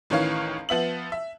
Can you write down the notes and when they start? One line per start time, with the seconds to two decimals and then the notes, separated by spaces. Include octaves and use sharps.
0.10 A1 D#3 E3 C#5 F5 C7
0.69 F3 B3 E5 F#7
1.12 E5